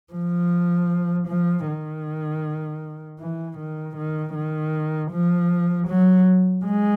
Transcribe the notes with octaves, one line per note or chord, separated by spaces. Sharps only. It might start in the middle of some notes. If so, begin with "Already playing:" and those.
F3
F3
D#3
E3
D#3
D#3
D#3
F3
F#3
G#3